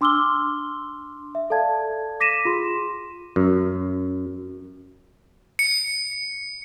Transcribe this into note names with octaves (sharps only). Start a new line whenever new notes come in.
D4 C6 D6 E6 F6 G7
E5
A4 D5 F5 A5 G#6
D6 A#6 B6 D#7 E7
F4 G#4 C6
F#2
C#7